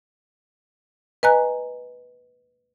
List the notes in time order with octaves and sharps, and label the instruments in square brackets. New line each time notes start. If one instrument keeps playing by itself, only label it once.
[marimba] B4 D#5 G#5 A#5 F#6